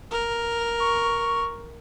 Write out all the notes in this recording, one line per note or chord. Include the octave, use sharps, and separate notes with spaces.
A#4
C#6